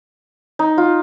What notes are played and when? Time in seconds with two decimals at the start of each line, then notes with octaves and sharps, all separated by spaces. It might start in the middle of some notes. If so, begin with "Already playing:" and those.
0.59 D#4
0.78 F4